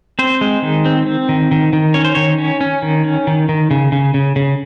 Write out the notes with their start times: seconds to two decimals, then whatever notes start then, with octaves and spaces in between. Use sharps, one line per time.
0.19 C4 C5
0.41 G#3
0.62 D#3
0.86 C4
1.06 C4
1.29 D#3
1.51 D#3
1.73 D#3
1.94 C#4 C#5
2.04 C5
2.15 D#3 C#5
2.38 C#4
2.61 C#4
2.82 D#3
3.05 C#4
3.27 D#3
3.49 D#3
3.71 C#3
3.92 C#3
4.14 C#3
4.36 C#3